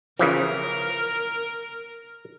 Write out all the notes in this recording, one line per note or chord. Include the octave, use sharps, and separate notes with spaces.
C#3 E3 F3 A#4